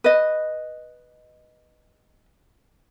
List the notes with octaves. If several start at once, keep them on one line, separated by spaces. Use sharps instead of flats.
B4 D#5